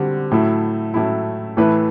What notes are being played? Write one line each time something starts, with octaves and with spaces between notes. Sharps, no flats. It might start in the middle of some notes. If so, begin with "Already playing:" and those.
Already playing: D3 G3 C4 F#4
A2 F#3 A3 E4
A2 F#3 A3 E4
A2 E3 A3 E4 B4